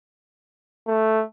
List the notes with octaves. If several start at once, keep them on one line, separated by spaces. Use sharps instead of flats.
A3